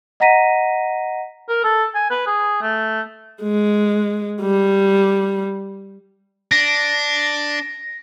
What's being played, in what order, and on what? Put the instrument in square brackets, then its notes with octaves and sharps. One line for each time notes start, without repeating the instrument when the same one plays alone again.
[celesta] D#5 F#5 A#5 A#6 B6 D#7
[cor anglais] A#4
A4
G#5
B4
G#4
A3
[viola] G#3
G3
[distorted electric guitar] D4 [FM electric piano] A#6